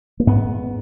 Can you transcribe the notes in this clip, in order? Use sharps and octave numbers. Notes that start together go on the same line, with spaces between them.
A#3
G#2 B3